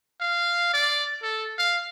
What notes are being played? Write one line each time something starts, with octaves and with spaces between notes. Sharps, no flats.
F5
D5
A4
F5